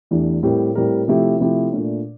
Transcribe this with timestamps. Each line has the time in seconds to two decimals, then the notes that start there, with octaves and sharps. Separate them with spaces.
0.11 E2 E3 A3 D4 G4
0.43 A2 G3 C4 G4 A#4
0.75 A2 G3 C4 G4 A#4
1.08 C3 F3 A3 E4 G4
1.40 C3 F3 A3 E4 G4
1.72 A#2 A3 D4